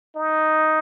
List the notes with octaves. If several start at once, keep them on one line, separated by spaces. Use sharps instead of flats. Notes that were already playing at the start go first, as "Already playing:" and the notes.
D#4